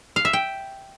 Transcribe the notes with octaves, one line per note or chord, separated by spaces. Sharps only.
F5
E5
G5